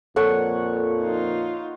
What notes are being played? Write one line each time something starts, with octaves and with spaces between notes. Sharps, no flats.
F2 A#2 F3 A4 C#5 F#5
D#4 F4